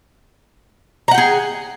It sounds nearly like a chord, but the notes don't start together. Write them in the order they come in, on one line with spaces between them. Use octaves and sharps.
A#5 F#5 G5 G#4